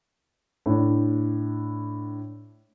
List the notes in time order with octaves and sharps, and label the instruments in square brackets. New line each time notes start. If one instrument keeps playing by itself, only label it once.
[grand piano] A2 D4